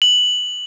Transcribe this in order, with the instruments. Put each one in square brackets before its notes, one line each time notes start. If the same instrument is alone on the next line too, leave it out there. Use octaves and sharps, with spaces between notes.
[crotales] F#7